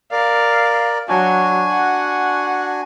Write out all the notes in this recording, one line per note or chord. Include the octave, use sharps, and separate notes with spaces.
A#4 D5 F5
F#3 D4 F#4 G#5
F#5